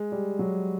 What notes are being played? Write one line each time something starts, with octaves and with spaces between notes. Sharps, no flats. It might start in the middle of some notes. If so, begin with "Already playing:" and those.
Already playing: G#3
G3
F#3